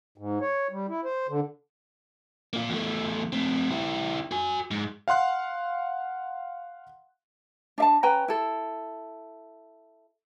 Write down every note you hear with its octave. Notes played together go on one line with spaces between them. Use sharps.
G#2
C#5
G3
E4
C5
D3
A#3 F4
E2 A3
A3 C4
E4 G4
F#4 G#5
G#2
F5 F#5 C6 F#6
D4 E5 A5
C#4 B4 G5 A#5
E4 A4